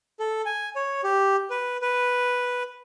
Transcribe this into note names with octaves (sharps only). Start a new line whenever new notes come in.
A4
G#5
C#5
G4
B4
B4